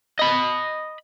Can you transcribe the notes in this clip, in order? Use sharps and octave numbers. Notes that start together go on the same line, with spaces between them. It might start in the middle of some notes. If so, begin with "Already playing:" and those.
D#5 B5